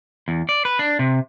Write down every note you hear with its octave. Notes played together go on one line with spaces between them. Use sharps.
E2
D5
B4
D4
C3